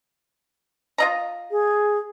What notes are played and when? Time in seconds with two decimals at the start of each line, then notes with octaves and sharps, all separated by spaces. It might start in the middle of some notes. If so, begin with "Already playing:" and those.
0.98 F4 D#5 A#5
1.51 G#4